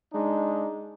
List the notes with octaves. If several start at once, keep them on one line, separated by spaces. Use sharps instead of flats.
G#3 D4 D#4